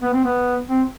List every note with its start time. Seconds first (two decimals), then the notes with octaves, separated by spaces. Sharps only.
0.02 B3
0.14 C4
0.24 B3
0.70 C4